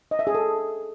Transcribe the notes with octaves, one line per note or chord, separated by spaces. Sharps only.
D#5
E5
G#4
A4